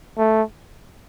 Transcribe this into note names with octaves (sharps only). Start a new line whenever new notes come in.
A3